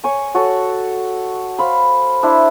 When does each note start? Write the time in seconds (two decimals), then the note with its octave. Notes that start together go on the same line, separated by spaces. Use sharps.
0.04 C#5 G#5 C#6
0.34 F#4 A4 C#5 F#5
1.58 C5 F5 B5
2.23 D4 E4 C5 B5